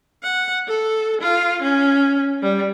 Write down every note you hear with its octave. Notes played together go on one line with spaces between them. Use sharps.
F#5
A4
F4
C#4
G3